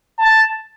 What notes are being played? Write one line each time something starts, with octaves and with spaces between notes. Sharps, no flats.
A5